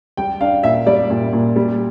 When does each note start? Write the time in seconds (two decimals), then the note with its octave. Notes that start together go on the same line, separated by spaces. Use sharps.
0.17 G3 G5
0.41 D4 F5
0.63 A#2 E5
0.86 G3 D5
1.10 A#2
1.33 A#2
1.56 G3